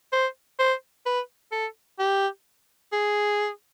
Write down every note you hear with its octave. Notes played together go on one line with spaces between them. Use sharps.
C5
C5
B4
A4
G4
G#4